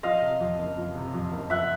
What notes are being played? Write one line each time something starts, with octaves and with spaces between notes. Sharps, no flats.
F3 D#5 F5
C3
F2
F#1
F3
C3
F2
F#1
F3 E5 F#5